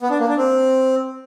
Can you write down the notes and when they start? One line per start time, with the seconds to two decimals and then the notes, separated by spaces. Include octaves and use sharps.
0.01 B3
0.10 D4
0.19 A#3
0.28 D4
0.37 C4